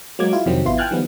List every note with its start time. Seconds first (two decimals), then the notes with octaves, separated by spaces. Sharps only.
0.19 F#3 G#3 A#3 D6 G#6
0.33 E4 F4
0.46 F2 C3 D#3 F#3 C4
0.65 G#1 B3 E4 F4 C6
0.78 G5 G#5 F6 F#6 G#6 A6
0.91 D#3 F3 G3 B3